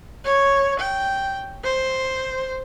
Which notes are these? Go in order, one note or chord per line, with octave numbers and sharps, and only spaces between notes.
C#5
G5
C5